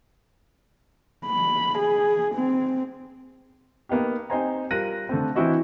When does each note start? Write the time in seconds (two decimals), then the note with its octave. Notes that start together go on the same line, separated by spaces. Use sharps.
1.26 B5
1.79 G#4
2.35 C4
3.89 A#3 B3 D#4 G4
4.30 C4 D#4 G4 C5 G#5 A#5
4.71 G3 F4 A#4 F#6 A#6 D#7
5.09 D3 A3 C4
5.36 E3 C4 D4 E4 F#4 D#5